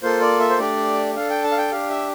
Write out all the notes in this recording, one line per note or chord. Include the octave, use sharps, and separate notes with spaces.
A#3 F4 A4 C5
D5
E5
C5
A3 D4 G4 D5
D4 A4 F5
G5
A5
F5
G5
D4 G4 F5
E5